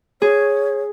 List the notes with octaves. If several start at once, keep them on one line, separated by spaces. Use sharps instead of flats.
G#4 C#5